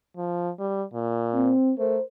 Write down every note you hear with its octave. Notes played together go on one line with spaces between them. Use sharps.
F3
G3
A#2
C4
A3 A#4 C5